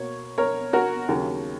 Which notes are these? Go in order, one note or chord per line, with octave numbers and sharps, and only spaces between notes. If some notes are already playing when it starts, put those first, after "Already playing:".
Already playing: B2 A#3 C#5
A#4 C#5
F#4 A#4
D#2 C#3 F#3 A#3 C#4